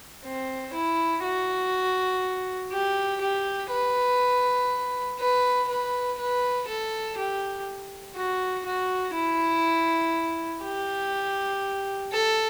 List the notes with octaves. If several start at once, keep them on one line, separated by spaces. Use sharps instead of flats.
C4
E4
F#4
G4
G4
B4
B4
B4
B4
A4
G4
F#4
F#4
E4
G4
A4